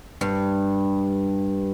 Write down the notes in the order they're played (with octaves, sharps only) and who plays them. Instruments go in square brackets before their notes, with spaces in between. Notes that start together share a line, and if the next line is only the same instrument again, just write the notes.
[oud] G2